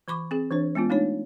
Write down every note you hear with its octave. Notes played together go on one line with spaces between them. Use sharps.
E3 B5 C#6 D6
C4 G#4
E3 D4 C5 C#5
G#3 B3 C#4 F4
A3 D4 D#4 C#5